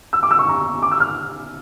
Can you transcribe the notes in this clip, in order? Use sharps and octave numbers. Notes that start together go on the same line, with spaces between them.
E6
D6
E6
C#6
A#5
D6
E6
F6